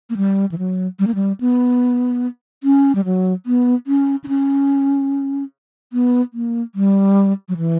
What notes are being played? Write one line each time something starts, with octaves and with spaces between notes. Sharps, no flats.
A#3
G3
E3
F#3
G3
A#3
G3
B3
C#4
G3
F#3
B3
C#4
D4
C#4
B3
A#3
G3
F#3
E3